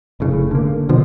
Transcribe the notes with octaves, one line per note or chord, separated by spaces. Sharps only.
F1 A2 C#3
D3 A#3
B2 D3 F3